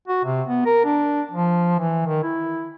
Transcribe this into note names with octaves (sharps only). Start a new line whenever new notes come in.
F#4
C3
B3
A#4
D4
F3
E3
D#3
E4